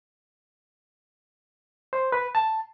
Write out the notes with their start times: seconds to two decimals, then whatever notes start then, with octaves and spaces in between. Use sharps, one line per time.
1.93 C5
2.12 B4
2.35 A5